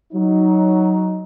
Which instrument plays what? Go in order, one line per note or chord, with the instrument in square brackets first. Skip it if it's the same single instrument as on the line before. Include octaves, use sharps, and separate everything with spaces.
[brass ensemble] F#3 D#4